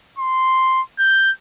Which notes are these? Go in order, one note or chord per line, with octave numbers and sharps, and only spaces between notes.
C6
G6